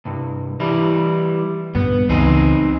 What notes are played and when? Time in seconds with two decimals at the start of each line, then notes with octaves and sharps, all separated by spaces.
0.05 C2 G2
0.60 E3 G3 E4
1.75 G2 A#2 D3 B3
2.09 C#2 E3 B3 C4 D#4 G#4